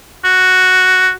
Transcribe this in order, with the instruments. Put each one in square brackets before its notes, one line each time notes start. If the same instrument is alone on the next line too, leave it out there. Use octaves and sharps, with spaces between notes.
[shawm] F#4